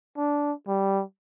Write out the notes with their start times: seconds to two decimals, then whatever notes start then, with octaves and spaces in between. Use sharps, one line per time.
0.17 D4
0.68 G3